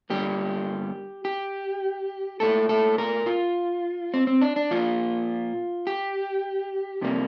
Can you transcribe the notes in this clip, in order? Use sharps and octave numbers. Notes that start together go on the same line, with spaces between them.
G2 D3 G3 A#3 G4
G4
A#2 A3 A4
A4
A#4
F4
C4
C4
D4
D4
A#2 F3 A#3 F4
G4
F2 C3 G3 A#3